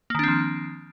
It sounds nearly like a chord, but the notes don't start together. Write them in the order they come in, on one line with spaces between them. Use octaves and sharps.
A#3 D#3 D4 C4 F3